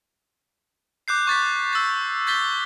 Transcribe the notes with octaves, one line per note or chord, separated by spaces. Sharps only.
D6 F#6 G6 C7
C#6 A6 B6
E6 A6
G6 A6 B6 G7